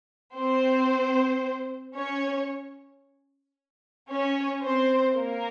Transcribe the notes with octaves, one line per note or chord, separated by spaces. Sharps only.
C4 C5
C#4 C#5
C#4 C#5
C4 C5
A#3 A#4